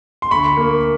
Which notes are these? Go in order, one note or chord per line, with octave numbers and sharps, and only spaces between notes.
C6
D2 B5 C#6
A#3